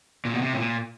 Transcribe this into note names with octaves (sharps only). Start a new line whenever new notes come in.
A#2
B2
C3
A2
A#2